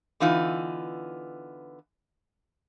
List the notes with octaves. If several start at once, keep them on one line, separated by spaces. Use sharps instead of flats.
D3 E3 B3 D#4 F4